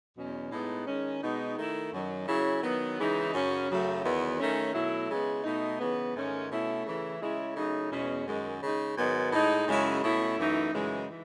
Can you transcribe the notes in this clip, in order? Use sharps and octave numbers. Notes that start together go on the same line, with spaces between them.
E2 B2 F#3 C#4
A2 G#3 B3 D#4
D#3 G#3 C#4
B2 G#3 B3 D#4
D#3 A3 E4
F#2 D#3 F#3
C#3 F#3 C#4 E4
D#3 F#3 B3
C#3 E3 G#3 D#4
F#2 C#3 F#3 C#4
F#2 C#3 F#3 A3
E2 D#3 F#3 B3
D#3 A3 C#4
B2 F#3 A3 E4
C#3 G#3 B3
B2 A3 D#4
C#3 E3 B3
G#2 D#3 A3 C#4
B2 A3 C#4 E4
C#3 E3 A3 E4
C#3 G#3 C#4 E4
C#3 F#3 A3 D#4
E2 B2 G#3 C#4
F#2 D#3 G#3
C#3 G#3 D#4
G#2 D#3 F#3 B3
A2 G#3 D#4
F#2 C#3 G#3 C#4 E4
B2 A3 C#4 E4
F#2 E3 A3 D#4
F#2 C#3 E3 G#3
E3